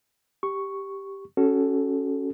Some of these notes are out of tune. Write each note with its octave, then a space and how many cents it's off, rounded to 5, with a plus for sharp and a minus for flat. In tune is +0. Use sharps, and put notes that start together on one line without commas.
G4 +0 C#6 +0
C#4 +0 F#4 +20 A4 -10